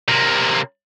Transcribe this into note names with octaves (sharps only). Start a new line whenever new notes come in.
C3 A#3